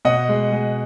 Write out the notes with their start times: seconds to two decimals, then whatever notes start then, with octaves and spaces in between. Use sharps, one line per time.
0.05 B2 D#5 F#5
0.29 G#3
0.52 G#3